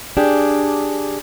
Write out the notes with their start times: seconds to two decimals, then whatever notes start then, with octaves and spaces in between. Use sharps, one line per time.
0.17 D4 G4 G#4